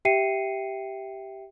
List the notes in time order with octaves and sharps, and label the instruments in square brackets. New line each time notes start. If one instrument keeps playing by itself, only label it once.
[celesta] G4 E5 G5 C7 C#7 D#7